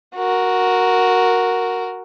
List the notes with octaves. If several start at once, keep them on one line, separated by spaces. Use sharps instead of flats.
F#4 A#4